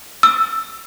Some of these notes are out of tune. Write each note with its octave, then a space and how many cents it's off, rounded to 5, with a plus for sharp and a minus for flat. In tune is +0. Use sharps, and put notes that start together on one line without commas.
E6 +5